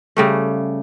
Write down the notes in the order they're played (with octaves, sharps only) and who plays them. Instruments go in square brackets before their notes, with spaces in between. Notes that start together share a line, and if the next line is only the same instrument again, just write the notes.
[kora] C#3 G3 A3